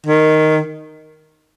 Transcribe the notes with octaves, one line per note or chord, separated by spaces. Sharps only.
D#3